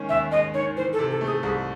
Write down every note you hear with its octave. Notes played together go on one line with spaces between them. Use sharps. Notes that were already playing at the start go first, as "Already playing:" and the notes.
Already playing: D#3 G#3 C#4
D#2 E5
G#3 D#5
D#3 C#5
E3 C5
A4
C3
A4
A3 G#4
C2 G#4